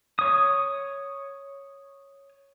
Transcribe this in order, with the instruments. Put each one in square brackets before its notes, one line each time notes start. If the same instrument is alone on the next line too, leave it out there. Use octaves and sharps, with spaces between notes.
[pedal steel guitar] C#5 D#6